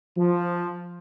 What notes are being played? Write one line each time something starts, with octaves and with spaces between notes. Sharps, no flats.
F3